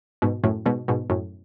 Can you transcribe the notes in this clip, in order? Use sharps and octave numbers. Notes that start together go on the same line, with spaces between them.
G#2 B2
F#2 A2
G#2 B2
G#2 B2
F#2 A2